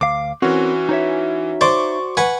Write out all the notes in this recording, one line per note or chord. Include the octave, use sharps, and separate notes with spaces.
D2 F5 D6
E3 C4 C#4 F#4 A#4
D#4 C#5 E5
C5 D5 C#6 D6
B4 F#5 G#5